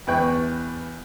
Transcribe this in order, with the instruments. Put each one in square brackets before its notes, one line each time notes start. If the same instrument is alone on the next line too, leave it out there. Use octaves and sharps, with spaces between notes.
[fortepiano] E2 B4 G5 C#6